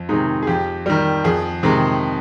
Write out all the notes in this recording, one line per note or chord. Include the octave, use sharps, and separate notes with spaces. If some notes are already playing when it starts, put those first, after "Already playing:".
Already playing: F2
C3 D#3 G#3 D#4
G#4
F2 G4
D#3 G3
F2 G#4
C3 D#3 G#3